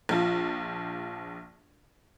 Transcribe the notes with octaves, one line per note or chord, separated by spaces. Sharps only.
A#1 F3 F4